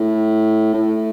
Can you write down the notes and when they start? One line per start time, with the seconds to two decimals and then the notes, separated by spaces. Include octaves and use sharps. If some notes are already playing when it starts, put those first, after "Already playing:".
Already playing: A2
0.74 A2